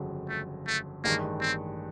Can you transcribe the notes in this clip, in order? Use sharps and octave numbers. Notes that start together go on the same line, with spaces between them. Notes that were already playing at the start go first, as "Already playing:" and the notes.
Already playing: G1 F2 C#3 F#3
A3
A3
A1 G2 D#3 G#3 A#3
C4